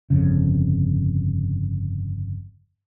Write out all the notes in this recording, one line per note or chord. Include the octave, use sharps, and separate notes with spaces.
G1 F2 C#3